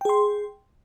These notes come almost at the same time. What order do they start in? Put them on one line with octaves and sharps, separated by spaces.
G5 G#4 C6